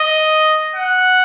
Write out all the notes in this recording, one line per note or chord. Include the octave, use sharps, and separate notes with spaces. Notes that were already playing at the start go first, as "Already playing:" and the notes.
Already playing: D#5
F#5